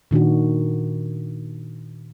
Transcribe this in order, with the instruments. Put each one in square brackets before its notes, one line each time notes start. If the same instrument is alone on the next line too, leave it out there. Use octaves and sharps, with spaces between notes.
[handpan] A#2 D#3 D4 F#4